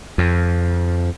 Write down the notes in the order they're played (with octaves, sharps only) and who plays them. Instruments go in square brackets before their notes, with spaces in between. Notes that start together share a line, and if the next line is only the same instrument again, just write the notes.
[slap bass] F2